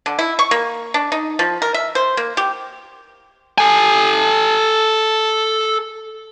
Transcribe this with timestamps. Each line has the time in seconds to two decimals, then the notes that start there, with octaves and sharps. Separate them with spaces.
0.06 D3
0.19 E4
0.39 C#6
0.51 A#3
0.94 D4
1.12 D#4
1.39 F3
1.62 A#4
1.74 E5
1.95 C5
2.17 A#3
2.37 G4
3.58 A4 G#5